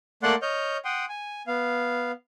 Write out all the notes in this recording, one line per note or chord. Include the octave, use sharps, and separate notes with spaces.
A3 A#3 D5 F#5 C6 F#6
C#5 D#5 F6 G6
F#5 G5 C6 D#6
G#5
B3 F5